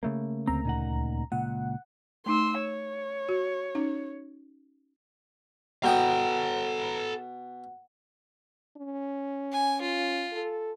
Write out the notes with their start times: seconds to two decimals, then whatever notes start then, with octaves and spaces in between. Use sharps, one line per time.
0.03 C#3 A3 A#3
0.47 D2 C4 A#5
0.65 A#2 D#4 F#5
1.32 C#2 A#2 F#5
2.26 A3 D#4 C6 E6
2.61 C#5
3.29 F#4
3.75 C#4 D#4
5.84 B2 A4 F#5 G5 A#5 D#6
8.77 C#4
9.52 G#5
9.81 F4
10.33 A4